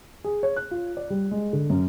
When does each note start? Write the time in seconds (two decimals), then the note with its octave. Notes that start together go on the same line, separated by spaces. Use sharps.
0.24 G#4
0.43 C#5
0.56 F#6
0.71 F4
0.97 D5
1.10 G3
1.31 G#3
1.53 D3
1.70 F#2